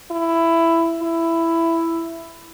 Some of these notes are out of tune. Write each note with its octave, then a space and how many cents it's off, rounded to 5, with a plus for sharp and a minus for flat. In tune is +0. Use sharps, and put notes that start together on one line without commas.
E4 +10
E4 +10